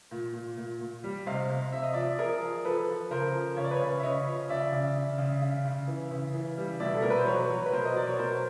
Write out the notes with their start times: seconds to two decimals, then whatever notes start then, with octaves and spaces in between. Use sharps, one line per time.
0.11 A#2
0.34 A#2
0.57 A#2
0.81 A#2
1.04 G3
1.27 C3 D#5 F5
1.49 C3
1.72 C3 E5
1.83 D#5
1.93 F3 D5 E5
2.18 F3 G#4 A#4
2.42 F3
2.65 F3 A4 B4
2.88 F3
3.11 C#3 A#4 C5
3.34 F3
3.57 C#3 C#5
3.64 D5
3.71 B4 C#5
3.81 C#3
3.99 E5
4.03 C#3 C#5 D#5
4.27 F3
4.49 C#3 D5 E5
4.72 C#3
4.95 C#3
5.18 C#3
5.41 C#3
5.65 C#3
5.87 E3
6.11 C#3
6.34 E3
6.57 G3
6.80 B2 D5 E5
6.94 A4
7.02 B2 A#4
7.10 B4
7.18 C5
7.26 F#3 B4 C#5
7.50 F#3
7.66 B4
7.72 B2 A#4 C5
7.85 D#5
7.96 F#3 D5
8.07 C#5
8.18 B2 A#4 C5